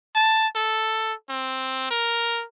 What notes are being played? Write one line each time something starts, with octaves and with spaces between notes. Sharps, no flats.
A5
A4
C4
A#4